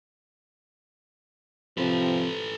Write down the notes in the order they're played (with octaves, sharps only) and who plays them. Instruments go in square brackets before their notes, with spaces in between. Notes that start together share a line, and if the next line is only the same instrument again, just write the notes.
[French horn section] C3 F3 C4 [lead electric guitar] A4 B4